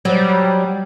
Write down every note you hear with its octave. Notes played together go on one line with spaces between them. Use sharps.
F#3 G3